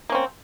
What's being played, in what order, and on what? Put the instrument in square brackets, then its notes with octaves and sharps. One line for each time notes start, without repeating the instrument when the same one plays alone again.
[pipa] A#3
C#4
C4